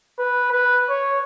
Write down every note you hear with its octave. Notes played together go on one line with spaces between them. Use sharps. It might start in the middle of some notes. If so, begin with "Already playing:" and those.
B4
B4
C#5